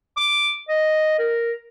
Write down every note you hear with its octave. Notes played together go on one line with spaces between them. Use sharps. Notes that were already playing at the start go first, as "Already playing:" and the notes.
D6
D#5
A#4